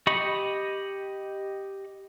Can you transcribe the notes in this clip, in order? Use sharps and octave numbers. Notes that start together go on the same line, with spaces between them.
G4 D#5 B5 C#6